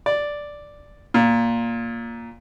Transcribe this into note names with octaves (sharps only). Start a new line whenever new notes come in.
D5
A#2